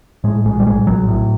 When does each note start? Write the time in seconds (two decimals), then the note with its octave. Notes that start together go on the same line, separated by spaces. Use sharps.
0.24 A2 G#3
0.45 A#1 G#3
0.60 G3
0.66 A2 G#3
0.87 A#1 F#3
1.08 A2